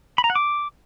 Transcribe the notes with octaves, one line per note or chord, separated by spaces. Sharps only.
B5
A#5
F#5
D6